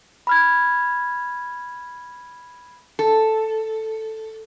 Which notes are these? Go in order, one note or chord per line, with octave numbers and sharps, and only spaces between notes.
B5 F6 G#6
A4